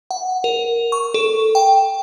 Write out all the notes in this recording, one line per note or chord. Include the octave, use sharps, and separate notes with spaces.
F#5
A#4
C#6
A4
G5